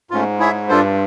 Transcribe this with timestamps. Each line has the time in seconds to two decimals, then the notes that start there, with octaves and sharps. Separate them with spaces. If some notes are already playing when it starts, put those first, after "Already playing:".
0.11 G#2 A3 C#4 F4
0.39 E4 G#4 C#5 E5
0.68 G2 D4 F4 A4 C5